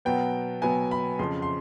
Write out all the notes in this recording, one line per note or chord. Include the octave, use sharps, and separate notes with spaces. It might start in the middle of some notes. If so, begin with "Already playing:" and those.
B2 F#3 B3 G5
B2 F#3 B3 G#5
B5
F2 C#3 F3 C6
C6